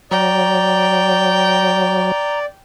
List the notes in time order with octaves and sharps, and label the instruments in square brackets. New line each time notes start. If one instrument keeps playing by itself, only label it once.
[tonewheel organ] F#3 [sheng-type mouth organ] D5 [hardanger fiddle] G5 [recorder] A#5